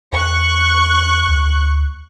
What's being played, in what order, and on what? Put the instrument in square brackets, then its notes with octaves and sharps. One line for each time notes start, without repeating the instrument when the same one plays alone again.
[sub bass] E2 [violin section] C#6 F#6
[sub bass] D2